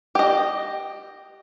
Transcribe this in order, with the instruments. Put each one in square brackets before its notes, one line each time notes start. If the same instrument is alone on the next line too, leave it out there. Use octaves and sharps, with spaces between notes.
[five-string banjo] G4 D#5